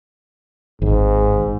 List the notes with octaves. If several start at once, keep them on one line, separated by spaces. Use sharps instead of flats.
G#1 G#2